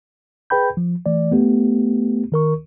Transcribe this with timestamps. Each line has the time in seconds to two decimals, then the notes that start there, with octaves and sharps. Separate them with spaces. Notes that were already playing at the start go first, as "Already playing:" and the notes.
0.50 G#4 B4 G5 B5 G6
0.77 F3
1.06 E3 A3 D5
1.31 A3 B3 G4
2.32 D#3 A#4 C#6